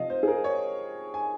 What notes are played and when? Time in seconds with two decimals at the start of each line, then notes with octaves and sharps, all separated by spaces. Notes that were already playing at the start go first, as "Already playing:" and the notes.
Already playing: C3 F3 D#5 F5
0.10 C5
0.23 G#4
0.28 A#4
0.44 C#5
1.14 G#5